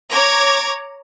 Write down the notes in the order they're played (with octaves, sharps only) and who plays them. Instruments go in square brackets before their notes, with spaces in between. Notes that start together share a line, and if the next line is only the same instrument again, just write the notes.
[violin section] C#5 A#5 D6 G#6